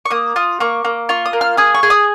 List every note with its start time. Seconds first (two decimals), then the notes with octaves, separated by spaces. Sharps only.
0.05 C#6
0.11 A#3 D#6
0.36 F4 D#6
0.60 A#3 C#6
0.85 A#3
1.09 F4 C#6
1.26 D#6
1.33 A#3
1.41 F6
1.57 G#4 D#6
1.75 C#6
1.83 G#4
1.90 D#6